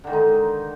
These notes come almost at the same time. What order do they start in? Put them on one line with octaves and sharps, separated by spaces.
D3 D#3 G#3 D#4